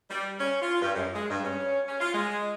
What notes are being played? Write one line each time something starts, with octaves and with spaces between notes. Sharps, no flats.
G3
C#4
F4
G2
F#2
G#3
G2
C#4
C#4
F4
G#3